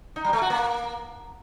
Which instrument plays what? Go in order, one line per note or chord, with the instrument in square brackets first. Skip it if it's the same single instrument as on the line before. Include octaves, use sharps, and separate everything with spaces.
[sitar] D#4
G3
A3
F#4
A#3